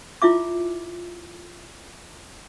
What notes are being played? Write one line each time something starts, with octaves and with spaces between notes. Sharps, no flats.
E4 F4 E5 D6